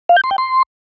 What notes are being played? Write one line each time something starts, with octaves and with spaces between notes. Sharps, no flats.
F5
G6
C6
G5
C6